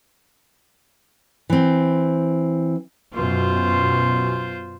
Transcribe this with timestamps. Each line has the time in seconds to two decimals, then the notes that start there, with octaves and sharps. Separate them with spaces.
1.50 E3 C4
3.14 F#2 B2 F4 C5